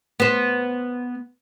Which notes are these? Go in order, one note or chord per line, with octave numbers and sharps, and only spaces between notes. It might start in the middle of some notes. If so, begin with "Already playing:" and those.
B3 C5